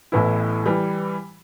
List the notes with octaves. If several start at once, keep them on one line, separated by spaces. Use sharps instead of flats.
A1 A2 E3 B3 E4
E3 G3